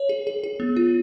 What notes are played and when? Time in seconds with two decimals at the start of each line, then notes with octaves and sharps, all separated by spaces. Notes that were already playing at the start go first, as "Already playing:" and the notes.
Already playing: C#5
0.09 G#4
0.27 G#4
0.44 G#4
0.60 B3
0.76 F4